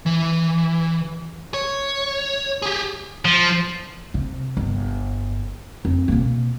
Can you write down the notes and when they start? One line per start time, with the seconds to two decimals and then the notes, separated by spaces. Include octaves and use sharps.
0.06 E3
1.54 C#5
2.62 G4 G#4
3.25 F3
4.14 C3
4.57 G1
5.85 F2
6.08 B2 A#3